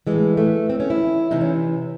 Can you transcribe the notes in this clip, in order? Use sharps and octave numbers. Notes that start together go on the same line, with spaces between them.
A2 E3 G#3
A3
C4
C#4
E4
C3 E3 D#4
C#4